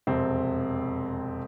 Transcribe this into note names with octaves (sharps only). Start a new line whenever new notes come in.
E1 F2 C3 C4